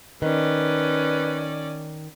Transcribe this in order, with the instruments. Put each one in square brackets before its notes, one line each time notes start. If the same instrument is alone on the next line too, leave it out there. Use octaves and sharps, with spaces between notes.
[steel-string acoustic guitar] D#3 [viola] C#4 D5 [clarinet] B4